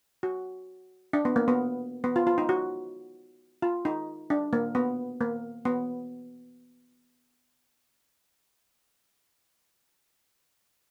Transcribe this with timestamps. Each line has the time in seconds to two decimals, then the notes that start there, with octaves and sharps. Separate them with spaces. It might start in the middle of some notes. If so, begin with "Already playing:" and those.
0.23 F#4
1.13 D4
1.25 B3
1.36 A#3
1.48 B3
2.04 B3
2.16 F4
2.27 F4
2.38 D#4
2.49 F#4
3.62 F4
3.85 D#4
4.30 D4
4.53 A#3
4.75 B3
5.21 A#3
5.65 B3